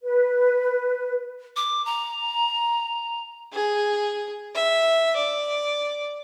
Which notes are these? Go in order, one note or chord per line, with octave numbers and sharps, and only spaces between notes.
B4
D6
A#5
G#4
E5
D5